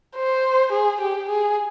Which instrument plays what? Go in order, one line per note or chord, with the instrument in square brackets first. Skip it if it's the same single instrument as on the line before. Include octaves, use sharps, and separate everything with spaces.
[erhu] C5
G#4
G4
G#4